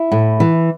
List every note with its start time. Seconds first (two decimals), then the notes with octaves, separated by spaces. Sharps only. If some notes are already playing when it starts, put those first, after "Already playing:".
Already playing: E4
0.12 A2
0.40 E3